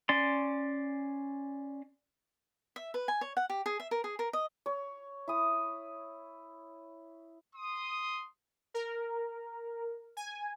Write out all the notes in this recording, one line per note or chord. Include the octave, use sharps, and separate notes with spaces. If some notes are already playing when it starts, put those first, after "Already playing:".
C#4 D5 C6
E5
B4
G#5
C#5
F#5
G4
G#4
E5
A#4
G#4
A#4
D#5
C#5
E4 D#6
C6 D#6
A#4
G#5